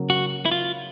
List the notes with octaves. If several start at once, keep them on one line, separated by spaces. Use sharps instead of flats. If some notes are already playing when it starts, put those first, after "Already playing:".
Already playing: C#3 F#3 A#3
F#4
E4
F4